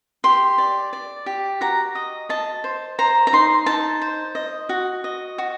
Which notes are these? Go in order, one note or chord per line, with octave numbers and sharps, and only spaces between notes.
G4 C6
D5
D5
G4
F#4 A#5
D#5
D#5 A5
C5
C5 A#5
A#5
D#4 C6
D#4 A5
C5
D#5
F#4
D#5
F#4